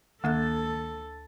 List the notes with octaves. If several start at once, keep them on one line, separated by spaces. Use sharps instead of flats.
D2 D#3 A#3 A4 E5 F#6